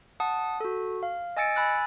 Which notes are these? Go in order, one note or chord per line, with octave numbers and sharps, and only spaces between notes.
F#5 A5 D#6
F#4 A4
F5
D#5 G#5 E6 A6 C#7 D7
G#5 B5 E6 F#6 A6